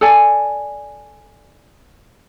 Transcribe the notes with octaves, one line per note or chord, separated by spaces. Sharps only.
A4 D5 G#5